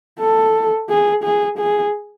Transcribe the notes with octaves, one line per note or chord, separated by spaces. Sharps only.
A4
G#4
G#4
G#4